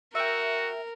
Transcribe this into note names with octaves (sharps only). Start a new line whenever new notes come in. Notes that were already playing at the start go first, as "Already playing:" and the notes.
F#4 A#4 E5 G5